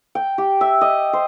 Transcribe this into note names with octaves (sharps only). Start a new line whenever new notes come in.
G5
G4
E5
D#5
C5